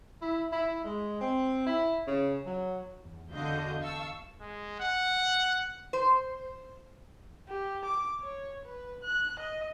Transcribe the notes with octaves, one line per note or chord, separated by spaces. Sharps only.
E4
E4
G#3
C4
E4
C#3
F#3
E2
E2 D3 F#4 D#5 F5 G6
F5 A5 C#6 E6
G#3
F#5
C5
G4
D6
C#5
B4
F#6
D#5